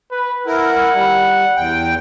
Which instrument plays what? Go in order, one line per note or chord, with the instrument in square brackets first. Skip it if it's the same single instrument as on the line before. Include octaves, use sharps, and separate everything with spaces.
[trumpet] B4
[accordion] E4 A#4 [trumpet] F#5
[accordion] G3
E2 G5